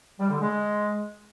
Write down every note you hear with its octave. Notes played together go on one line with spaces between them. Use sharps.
G3
D3
G#3